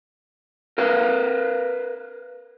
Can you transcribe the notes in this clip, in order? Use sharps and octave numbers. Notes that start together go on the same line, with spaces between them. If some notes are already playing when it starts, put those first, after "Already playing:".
A#4 B4 F5